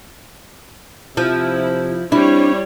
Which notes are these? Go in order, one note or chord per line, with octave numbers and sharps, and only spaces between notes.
C3 F3 E4
G3 C4 D4 E4 C#5